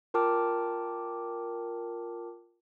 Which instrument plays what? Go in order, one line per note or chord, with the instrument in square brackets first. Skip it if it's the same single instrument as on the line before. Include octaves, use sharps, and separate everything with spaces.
[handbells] F4 A#4 G5 A5 D6 F6